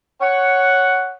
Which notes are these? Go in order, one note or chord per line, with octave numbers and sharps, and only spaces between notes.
C#5 F#5